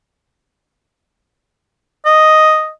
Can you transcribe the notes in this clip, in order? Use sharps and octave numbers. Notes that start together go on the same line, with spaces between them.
D#5